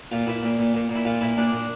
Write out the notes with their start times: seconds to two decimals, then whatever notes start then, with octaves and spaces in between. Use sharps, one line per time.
0.11 A#2 F4
0.27 A#2 E4
0.43 A#2
0.59 A#2
0.74 A#2
0.89 A#2
0.95 E4
1.05 A#2 F4
1.21 A#2 E4
1.37 A#2 D4
1.52 A#2